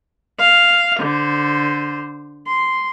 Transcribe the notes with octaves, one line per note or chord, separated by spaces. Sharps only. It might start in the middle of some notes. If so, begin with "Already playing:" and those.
F5
D3 C5
C6